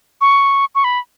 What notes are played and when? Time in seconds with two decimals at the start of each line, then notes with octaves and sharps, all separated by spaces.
0.21 C#6
0.75 C#6
0.84 B5